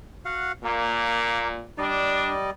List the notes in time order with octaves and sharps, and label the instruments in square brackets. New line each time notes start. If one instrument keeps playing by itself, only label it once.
[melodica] F#4 F5 F#5
[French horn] A#2 [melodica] A#3
[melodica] G3 D5 D#5 [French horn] D4